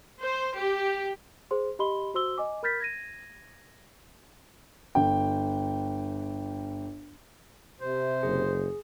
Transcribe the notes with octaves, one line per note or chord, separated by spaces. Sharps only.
C5
G4
G#4 C5 C6
G4 D#5 B5 C6 G7
F#4 C5 C6 E6 G7
D#5 G#5 D6
A#4 B5 F6 G6 A6 B6
G#6 A#6 D#7
G1 G5
C3 C5
F#1 G#4